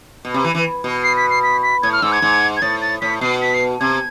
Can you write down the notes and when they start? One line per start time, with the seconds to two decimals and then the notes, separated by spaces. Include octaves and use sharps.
0.25 B2
0.34 C3
0.44 E3
0.55 E3
0.84 B2
1.03 C7
1.17 B6
1.30 C7
1.43 B6
1.63 B6
1.83 A2 G#6
1.93 F6
2.02 G#2 E6
2.12 G#6
2.22 G#2
2.57 G#6
2.62 A2 A6
2.81 A6
3.01 A2 B6
3.21 B2 C7
3.42 B6
3.54 C7
3.80 C3 G#6